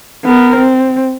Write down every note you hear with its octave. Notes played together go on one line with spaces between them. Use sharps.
B3 A#4
C4